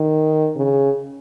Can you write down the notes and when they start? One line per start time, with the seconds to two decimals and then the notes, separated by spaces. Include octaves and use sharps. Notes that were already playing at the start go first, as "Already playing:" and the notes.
Already playing: D#3
0.56 C#3